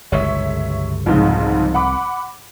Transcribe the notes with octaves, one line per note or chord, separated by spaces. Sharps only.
G1 C#2 F#2 C#5 E5
C2 F2 G#2 C#3
F#5 B5 D6